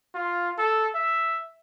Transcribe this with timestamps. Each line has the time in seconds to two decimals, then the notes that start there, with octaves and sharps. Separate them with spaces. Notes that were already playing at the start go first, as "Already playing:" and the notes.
0.15 F4
0.58 A4
0.95 E5